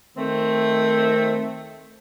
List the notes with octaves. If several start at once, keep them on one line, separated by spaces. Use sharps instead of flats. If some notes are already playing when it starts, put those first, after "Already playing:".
D#3 A3 C4